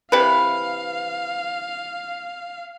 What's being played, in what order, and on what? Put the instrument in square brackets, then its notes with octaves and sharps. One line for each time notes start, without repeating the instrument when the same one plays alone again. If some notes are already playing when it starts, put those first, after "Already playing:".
[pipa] C3 E3 B4 [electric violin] F5